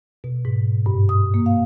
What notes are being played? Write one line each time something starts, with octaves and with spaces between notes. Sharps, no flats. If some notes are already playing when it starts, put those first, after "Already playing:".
B2
G#2
G2
D#6
A#3
F5